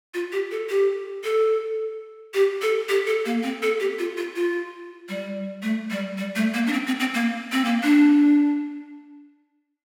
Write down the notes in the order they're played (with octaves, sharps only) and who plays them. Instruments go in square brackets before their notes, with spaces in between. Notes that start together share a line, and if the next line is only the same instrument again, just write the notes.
[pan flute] F4
G4
A4
G4
A4
G4
A4
G4
A4
A#3
C4
A4
G4
F4
F4
F4
G3
A3
G3
G3
A3
A#3
D4
C4
C4
C4
A#3
C4
A#3
D4